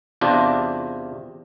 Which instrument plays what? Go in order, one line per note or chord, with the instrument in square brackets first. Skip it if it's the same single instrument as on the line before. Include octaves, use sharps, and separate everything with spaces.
[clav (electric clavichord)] E2 C3 D4 F4